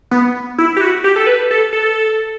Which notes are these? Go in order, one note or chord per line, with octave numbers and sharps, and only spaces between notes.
B3
E4
G4
F#4
G4
A4
B4
A4
A4